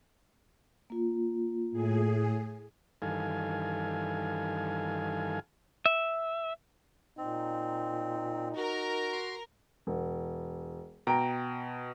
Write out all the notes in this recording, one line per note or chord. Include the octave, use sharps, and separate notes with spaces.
A#3 F4
A2 G#4
G2 D#3 E3 A4 F5 G#5
E5
A#2 C4 D#4
F#4 A#4
C6
E1
B2 G5 A#5 D7